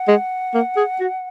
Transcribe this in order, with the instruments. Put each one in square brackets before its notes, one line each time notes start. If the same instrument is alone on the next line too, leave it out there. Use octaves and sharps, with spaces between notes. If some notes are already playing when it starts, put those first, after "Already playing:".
Already playing: [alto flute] F#5
[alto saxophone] G#3
A#3
G#4
F#4